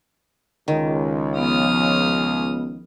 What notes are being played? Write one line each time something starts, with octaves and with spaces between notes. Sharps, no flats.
C#2 D#3
F3 B3 D#6 F6